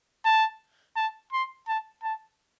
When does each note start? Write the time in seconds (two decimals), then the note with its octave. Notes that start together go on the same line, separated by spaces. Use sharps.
0.25 A5
0.96 A5
1.32 C6
1.68 A5
2.03 A5